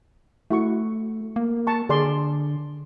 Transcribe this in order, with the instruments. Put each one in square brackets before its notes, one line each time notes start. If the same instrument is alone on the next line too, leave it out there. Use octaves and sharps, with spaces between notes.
[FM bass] A3 [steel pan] E4 F#4 C#6
[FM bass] A#3
[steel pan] A5 C#6
[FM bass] D3 [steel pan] G#4 D5 C6